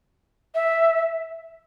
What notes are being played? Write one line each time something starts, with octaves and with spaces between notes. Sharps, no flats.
E5